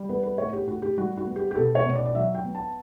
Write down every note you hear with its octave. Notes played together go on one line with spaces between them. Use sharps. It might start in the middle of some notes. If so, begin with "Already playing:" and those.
Already playing: G3
B3 B4
B4
A2 C#5
G4
A2 F#4
G4
G3 F#4
F#4
B3
G4
G4
B2 A4
C#5
B2
D5
D5
F#3 E5
G5
B3
A5